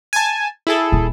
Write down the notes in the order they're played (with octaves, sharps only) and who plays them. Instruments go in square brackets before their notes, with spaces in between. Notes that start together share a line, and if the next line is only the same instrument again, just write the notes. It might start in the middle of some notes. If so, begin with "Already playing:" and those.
[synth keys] G#5 A5
E4 G#4 A4
[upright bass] D#1